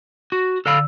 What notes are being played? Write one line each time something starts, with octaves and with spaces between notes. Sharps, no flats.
F#4
D3 A4 F5 B5 E6